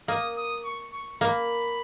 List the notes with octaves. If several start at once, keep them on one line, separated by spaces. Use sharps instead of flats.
A#3 D#6
D#6
C#6
C#6
A#3 B5